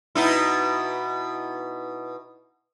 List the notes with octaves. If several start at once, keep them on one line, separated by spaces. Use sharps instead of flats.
B2 D#4 E4